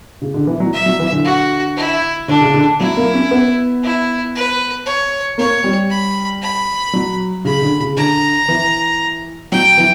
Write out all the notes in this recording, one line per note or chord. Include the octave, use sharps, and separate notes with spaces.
C#3
D3
E3
F#3
E5
F#3
E3
D3
F#4
E4
D3 D4
C#3
D3
F#3 E4
A#3
C#4
B3
E4
B4
C#5
A#3 C#5
G3
B5
B5
F#3
C#3 B5
D3
C#3
D3 A#5
E3
F#3 G5
E3